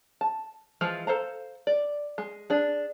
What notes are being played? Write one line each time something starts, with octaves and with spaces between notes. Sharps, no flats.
A5
E3 F3 G#3 F4
A4 C5 F5 A#5
D5
G#3
D4 G#4